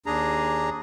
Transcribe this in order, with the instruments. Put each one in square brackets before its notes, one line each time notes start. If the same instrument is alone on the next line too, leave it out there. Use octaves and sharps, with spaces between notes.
[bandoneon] D#2 D4 G#4 A#5